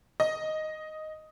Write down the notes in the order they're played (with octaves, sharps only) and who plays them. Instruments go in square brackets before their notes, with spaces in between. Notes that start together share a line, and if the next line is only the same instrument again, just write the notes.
[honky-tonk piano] D#5